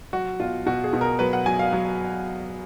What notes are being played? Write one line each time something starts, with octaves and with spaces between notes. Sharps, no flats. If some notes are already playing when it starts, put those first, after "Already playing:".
F#3 F#4
B2 F4
B2 F#4
G#4
B2
A#4
F#3 B4
F#5
F#3 G#5
F5
F#3